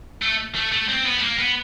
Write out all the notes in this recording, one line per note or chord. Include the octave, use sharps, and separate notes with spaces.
A3
A3
A3
C4
B3
A3
A#3
B3